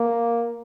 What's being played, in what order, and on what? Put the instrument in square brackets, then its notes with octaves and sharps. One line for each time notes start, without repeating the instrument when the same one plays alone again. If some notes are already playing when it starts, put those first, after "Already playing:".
Already playing: [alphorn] A#3